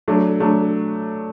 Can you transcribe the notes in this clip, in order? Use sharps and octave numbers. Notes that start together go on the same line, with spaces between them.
F#3 A3 D4
F#3 A3 D4